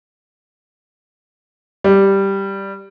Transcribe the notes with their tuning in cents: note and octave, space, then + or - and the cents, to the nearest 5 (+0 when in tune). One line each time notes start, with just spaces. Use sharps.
G3 +0